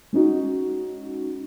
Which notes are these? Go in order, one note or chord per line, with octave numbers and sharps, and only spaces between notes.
G#3 C#4 D#4 F#4